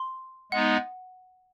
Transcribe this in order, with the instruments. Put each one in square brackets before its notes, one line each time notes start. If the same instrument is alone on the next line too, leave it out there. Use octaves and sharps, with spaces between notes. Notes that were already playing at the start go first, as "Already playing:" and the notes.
Already playing: [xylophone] C6
[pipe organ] G#3 B3 D#4 [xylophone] F#5